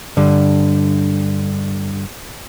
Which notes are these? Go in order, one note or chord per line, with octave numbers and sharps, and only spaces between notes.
G2 D3